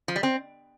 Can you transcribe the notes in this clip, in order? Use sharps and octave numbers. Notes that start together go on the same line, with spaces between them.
F3
G3
C4